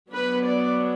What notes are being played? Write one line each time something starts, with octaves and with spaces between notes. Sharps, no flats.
F#3 B3 D4 B4
D5